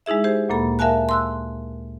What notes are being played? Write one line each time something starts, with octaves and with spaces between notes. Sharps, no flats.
G#3 D#4 E4 G#4 E5
G4 G#4 C5
D2 A#2 A#3 A4 B5
A#4 E5 F5 G#5 A5 F#6
C6 E6 F#6